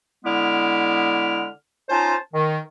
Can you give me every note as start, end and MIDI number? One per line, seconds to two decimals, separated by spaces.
0.25 1.47 50
0.25 1.47 56
0.25 1.47 59
0.25 1.47 64
0.25 1.47 86
0.25 1.47 89
1.89 2.15 61
1.89 2.15 63
1.89 2.15 65
1.89 2.15 72
1.89 2.15 81
2.32 2.58 51